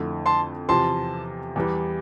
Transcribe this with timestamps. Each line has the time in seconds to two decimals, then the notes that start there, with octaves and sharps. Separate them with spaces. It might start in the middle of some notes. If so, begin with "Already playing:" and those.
Already playing: F2 D3 A3 E4
0.26 A5 C6
0.69 E2 C3 F3 A5 C6
1.56 E2 E3 G3